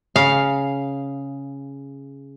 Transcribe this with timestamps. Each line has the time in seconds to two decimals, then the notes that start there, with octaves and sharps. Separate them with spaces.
0.16 C#3 F5